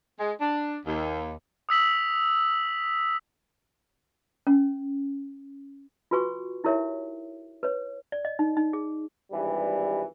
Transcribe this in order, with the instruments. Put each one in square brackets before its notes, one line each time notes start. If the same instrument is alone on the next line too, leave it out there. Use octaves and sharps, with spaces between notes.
[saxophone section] G#3
D4
D#2
[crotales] D#6 E6 B6 F#7
[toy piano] C#4
F4 F#4 B4 G#5 C#6
D#4 E4 G4 A#4 C#5 E5
B4 C#5
D5
D#5
D#4
D#4
G#4
[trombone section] G#1 G2 E3 G3